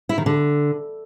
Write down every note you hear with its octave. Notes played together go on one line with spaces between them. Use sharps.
E4
D#3
D3